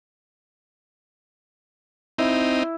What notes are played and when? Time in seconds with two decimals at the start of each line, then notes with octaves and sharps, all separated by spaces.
2.18 C4 D#4 E4